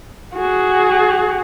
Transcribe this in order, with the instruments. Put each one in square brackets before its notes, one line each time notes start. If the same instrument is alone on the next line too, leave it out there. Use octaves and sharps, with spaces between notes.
[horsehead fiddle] F#4 G#4